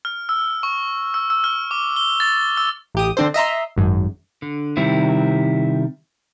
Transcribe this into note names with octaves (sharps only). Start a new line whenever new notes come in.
F6
E6
C#6
E6
E6
F6
D6
G7
A6
E6
A1 G4 D#6
D3 C4 D4 A4 C5
D#5 E5 A#5 C6
G#1 F#2
D3
C3 D#3 G3 C4 E4